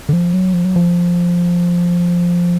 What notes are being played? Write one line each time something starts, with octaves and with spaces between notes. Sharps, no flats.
D3
F3
F#3
F3
F#3
F3